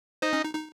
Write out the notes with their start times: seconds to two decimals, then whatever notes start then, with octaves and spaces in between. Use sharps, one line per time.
0.22 D#4 C5
0.33 C#4
0.44 D#4
0.55 D#4